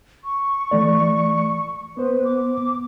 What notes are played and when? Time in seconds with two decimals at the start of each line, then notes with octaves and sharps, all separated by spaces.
0.24 C#6
0.71 E3 A3 D5
1.97 B3 B4 C5
2.25 D6